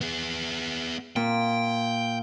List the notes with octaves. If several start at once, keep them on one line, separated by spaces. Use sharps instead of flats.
B3 G#4
A#2 G5